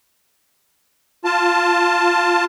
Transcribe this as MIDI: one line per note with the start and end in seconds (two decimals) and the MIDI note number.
1.25 2.45 65
1.25 2.45 81